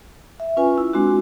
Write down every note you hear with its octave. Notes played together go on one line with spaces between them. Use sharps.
E5
C#4 F4 B4 G#5
E4
G#3 C4 D4 F#4